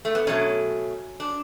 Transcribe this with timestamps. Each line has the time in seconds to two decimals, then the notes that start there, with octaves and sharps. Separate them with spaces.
0.05 A3
0.15 B3
0.27 B2 F#3 A3 C#4
1.20 D4